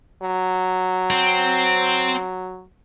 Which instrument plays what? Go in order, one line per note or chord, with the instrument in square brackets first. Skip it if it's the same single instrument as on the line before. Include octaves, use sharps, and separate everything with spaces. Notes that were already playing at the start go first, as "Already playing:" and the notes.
[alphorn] F#3
[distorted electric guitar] C4